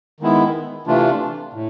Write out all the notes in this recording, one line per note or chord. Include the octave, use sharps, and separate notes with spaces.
D#3 G#3 B3 E4
C3 E3 A3 D4 F4
A2